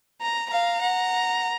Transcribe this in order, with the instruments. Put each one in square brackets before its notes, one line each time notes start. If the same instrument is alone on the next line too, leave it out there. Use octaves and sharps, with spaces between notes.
[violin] A#5
[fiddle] F5 [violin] A#5
[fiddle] F#5